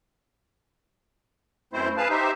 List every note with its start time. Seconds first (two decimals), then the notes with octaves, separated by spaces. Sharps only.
1.73 F#2 B2 A3 C4 E4 C5
1.97 G#4 B4 F5 A5
2.10 D#4 G4 C5 E5